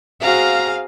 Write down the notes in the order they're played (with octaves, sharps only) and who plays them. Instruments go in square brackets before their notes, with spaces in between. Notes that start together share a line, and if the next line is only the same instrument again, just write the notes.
[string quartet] C4 G#4 [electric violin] F#4 A#5 [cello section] F5